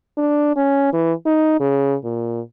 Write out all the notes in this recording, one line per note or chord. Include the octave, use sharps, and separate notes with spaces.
D4
C#4
E3
D#4
C#3
A#2